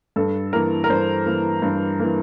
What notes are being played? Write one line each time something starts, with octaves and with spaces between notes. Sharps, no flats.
G2 A4
E3 A#3 A#4
A#4
G2 C5
E3 A#3
G2
E3 A#3